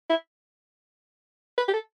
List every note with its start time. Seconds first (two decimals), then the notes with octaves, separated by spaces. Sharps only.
0.10 E4
1.58 B4
1.68 G4
1.74 A4